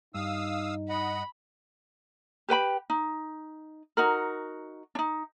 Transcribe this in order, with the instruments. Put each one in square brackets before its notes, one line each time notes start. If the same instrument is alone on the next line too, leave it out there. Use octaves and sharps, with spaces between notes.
[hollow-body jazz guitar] G2 [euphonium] D#4 [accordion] F5 D#6 E6
[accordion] D#5 F#5 [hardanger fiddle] B5
[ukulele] G4 B4 G5 B5
D#4
D#4 F#4 A#4
D4 D#4